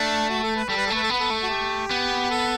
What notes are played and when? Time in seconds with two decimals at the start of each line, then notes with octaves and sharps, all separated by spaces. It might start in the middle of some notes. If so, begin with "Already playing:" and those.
Already playing: A3 D4
0.29 F#4
0.43 A4
0.56 B4
0.69 G3 A4
0.77 B4
0.86 A4
0.90 A3
0.95 B4
1.03 A4
1.10 B3 B4
1.20 A4
1.30 A3
1.43 F#4
1.50 G4
1.91 B3
2.30 A4